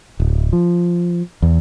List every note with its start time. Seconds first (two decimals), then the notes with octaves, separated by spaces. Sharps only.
0.20 D1
0.53 F3
1.42 E2